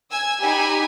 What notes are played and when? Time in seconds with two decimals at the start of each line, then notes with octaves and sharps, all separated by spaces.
0.11 G#5 E6
0.41 D#4 G4 G#5 B5